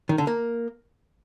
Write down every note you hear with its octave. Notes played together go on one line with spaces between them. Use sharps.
D#3
D3
A#3